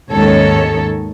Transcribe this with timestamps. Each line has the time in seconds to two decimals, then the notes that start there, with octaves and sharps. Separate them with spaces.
0.11 D#2 G#2 D#3 C#4 A4 C#5